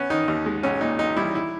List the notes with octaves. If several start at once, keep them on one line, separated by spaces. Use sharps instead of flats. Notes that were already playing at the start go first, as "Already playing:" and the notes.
Already playing: B3 C#4
D#3 D#4
D#2
G#3
B1 C#4
A#2 D#4
B1 D#4
G3 E4
E4